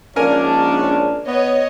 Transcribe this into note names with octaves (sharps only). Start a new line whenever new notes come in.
A#1 G#2 A#3 C#4 D4 A#4 G#5
B3 C#5 D#5